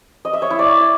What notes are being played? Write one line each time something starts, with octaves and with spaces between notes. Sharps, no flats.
D#5
E5
C#5
E4
D5